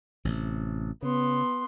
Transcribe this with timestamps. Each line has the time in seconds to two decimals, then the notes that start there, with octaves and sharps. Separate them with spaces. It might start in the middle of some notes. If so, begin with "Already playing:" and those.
0.25 A1 C3
1.02 C#3 B3 C6